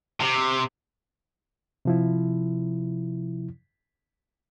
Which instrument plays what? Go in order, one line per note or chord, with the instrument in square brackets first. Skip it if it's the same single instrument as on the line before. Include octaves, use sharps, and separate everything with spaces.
[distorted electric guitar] C3
[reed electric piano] C3 F3 E4